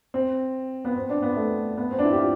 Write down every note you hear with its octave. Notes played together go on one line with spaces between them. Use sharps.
C4
B3
C4
D4
B3
A3
B3
C4
D4
E4
G4
F4